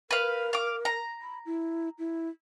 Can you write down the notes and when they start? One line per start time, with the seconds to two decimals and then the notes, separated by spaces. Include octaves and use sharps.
0.11 A#4 B4 F5
0.53 F5 D6
0.85 A#5
1.22 B5
1.46 E4
1.99 E4